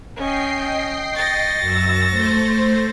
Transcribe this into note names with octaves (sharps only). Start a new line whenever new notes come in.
C#4 D#5 G5 C7
C#6 A6 A#6
F#2 E6
A3 C5